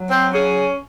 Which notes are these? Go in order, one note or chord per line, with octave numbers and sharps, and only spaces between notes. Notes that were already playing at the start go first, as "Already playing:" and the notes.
Already playing: F#3
C4 C5
C#4 G#4